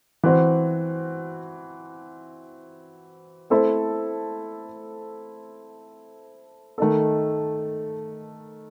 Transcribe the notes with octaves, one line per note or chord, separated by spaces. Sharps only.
E3 C4 F#4 C5
A3 C4 E4 A4 C5
D#3 A3 D#4 A4